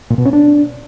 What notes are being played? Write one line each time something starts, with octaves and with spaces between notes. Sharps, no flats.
A#2
B2
C#4
D4